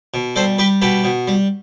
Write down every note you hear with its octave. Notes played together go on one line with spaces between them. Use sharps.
B2
G3 A4 C5
G3 G4 B4
B2 G4 B4
B2
G3